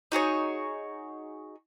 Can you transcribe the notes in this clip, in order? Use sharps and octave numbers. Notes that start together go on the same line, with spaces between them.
D#4 F#4 G#4 C#5